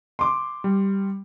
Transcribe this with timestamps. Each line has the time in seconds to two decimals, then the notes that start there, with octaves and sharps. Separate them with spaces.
0.19 C6 D6
0.64 G3